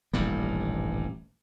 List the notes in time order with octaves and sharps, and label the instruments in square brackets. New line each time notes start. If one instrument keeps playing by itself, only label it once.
[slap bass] D#1 A1 G2 G3